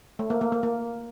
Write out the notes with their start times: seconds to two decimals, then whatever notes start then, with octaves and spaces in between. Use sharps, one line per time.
0.19 A3
0.30 A#3
0.41 A#3
0.52 A#3
0.63 A#3